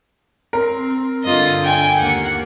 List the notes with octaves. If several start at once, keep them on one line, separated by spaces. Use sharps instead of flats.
C4 A#4
G2 D3 F4 D#5
G5 G#5
D#2 A#3 F#5